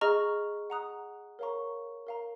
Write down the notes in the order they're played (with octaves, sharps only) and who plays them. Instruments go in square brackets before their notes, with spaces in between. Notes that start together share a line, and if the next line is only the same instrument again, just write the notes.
[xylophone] G#4 D#5 A#5 C#6 F6
F#5 A#5 D#6 F#6
A#4 C#5 F5 A#5 C#6
A#4 F5 A#5